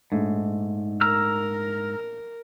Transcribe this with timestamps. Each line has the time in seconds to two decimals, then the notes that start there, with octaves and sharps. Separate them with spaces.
0.12 A#1 G#2 A3 D#4
1.01 A#4 A#5 E6 F6